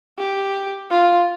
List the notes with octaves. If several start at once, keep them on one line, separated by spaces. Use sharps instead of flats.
G4
F4